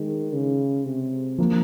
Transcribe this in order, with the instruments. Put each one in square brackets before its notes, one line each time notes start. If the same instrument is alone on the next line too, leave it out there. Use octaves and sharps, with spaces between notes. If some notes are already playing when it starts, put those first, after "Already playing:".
Already playing: [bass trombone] D#3 [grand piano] G#3
[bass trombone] C#3
C3
[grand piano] F3 A#3